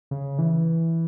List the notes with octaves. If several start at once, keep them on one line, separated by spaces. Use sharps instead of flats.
C#3
E3